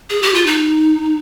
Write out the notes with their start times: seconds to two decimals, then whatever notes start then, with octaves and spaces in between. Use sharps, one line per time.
0.10 G#4
0.22 G4
0.34 F4
0.46 D#4